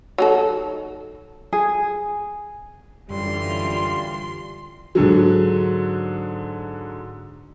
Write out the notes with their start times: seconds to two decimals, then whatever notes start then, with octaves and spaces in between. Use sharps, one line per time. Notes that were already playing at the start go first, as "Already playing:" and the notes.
0.18 F#3 D#4 A4
1.53 G#4
3.10 F#2 D3 E3 G3 F4 C6
4.95 G#2 D3 F#3